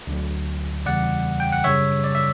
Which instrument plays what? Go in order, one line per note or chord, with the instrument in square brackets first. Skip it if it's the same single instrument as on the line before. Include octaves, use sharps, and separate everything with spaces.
[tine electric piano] D2 D3 F#3
E2 C#3 E3 G3 D5 F#5
G5
F#5
F#2 C#3 G3 C#5 E5
D5
E5